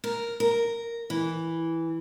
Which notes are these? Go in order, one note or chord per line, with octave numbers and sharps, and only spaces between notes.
A#4
A#4
E3